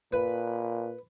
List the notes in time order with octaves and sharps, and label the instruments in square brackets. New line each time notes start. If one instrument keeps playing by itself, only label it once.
[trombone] A#2 [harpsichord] B4